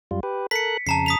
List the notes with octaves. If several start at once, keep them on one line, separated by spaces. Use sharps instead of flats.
F#2 G3 F4
G4 B4
A4 A#4 F#6 B6 C#7
F2 C#3 A5 A#5 C7
D#6 B6 F7